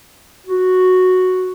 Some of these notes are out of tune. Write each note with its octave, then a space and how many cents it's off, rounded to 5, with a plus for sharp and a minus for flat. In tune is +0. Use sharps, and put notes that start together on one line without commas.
F#4 -5